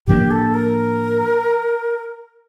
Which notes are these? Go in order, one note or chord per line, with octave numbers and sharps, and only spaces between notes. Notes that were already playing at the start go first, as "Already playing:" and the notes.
A2 F3 A#3 D4 G4
A4
A#4